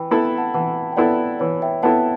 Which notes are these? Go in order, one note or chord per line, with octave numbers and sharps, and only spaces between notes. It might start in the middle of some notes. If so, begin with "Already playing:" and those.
Already playing: E3 G5 B5
B3 E4 A4 A5
B5
F#5 A5
E3 F#5 A5
G5
B3 E4 A4 D5 F#5
E3 C#5
E5 G5
B3 E4 A4 F#5 A5